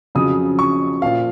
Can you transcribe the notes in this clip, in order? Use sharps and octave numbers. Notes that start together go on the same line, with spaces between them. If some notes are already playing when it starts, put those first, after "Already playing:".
F2 C#3 F#3 D#6
C#6
A#2 F3 F5